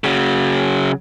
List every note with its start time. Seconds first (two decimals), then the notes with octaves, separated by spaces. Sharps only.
0.04 C#3 F#3